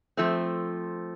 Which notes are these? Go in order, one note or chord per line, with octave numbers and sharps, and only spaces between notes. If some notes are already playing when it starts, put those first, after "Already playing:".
F3 A3 C4